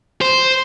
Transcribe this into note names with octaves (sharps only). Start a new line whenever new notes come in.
C5